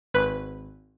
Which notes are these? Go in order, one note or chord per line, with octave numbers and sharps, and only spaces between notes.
G#1 B4